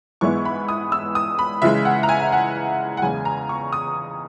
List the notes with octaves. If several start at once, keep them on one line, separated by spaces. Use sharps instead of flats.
G#2 E3 G#3 B3 E4 C#6
B5
D#6
E6
D#6
B5
C#3 E3 G#3 E5
F#5
A#5
G#5
E5
F#5
F#5
E2 C#3 G#3 G#5
A#5
C#6
D#6